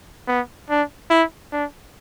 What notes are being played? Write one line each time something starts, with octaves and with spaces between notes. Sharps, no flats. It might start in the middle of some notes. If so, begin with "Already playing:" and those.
B3
D4
E4
D4